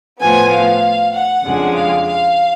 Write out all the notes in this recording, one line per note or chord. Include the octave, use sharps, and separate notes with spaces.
A2 F3 B3 G#5
F5
F#5
F2 C#3 G#3 D4
F5
F5